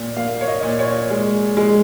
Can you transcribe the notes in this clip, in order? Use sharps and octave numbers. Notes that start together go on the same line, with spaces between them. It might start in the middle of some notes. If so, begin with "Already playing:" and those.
Already playing: A#2
A#3 F5
C#5
D#5
A#2
C#5
G#3
G#3